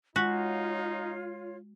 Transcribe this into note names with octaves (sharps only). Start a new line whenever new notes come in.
G#3 D#4 F4 F#4 C#5